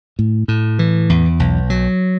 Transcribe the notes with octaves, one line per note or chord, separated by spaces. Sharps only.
A2
A2
E3
E2
B1
F#3